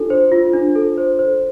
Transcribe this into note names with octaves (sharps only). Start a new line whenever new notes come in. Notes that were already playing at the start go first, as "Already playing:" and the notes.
Already playing: D4 F4 A4
C5
F4
D4
A4
C5
C5